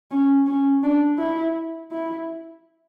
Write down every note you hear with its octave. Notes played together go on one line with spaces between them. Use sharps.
C#4
C#4
D4
E4
E4